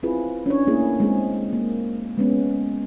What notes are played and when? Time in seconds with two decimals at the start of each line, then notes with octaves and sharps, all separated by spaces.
0.03 C4 E4 F4 G#4 B4
0.46 C#4 D4 C#5
0.67 A3 A#3 E4 G#4
1.00 G#3 C4 G#4
1.53 A#3
2.17 G#3 B3 C#4